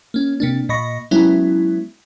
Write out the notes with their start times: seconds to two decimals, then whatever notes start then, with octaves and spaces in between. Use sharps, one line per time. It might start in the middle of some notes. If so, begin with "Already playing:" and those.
0.14 A#3 C#4
0.40 C3 A#3 D4
0.69 A#2 D#5 B5 C#6 A#6
1.11 F#3 G#3 B3 C#4 E4